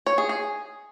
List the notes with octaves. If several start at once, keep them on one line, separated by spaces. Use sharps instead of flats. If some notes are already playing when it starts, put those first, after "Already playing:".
C#5
G#4
G#4